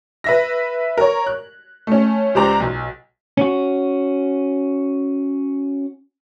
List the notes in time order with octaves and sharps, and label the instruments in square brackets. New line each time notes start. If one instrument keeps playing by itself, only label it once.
[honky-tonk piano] B4 E5 A#6
A#4 C#5
F#6
A3 C#4
C#2 G4 C5 D5 A#5
B1
[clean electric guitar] C#4 F#4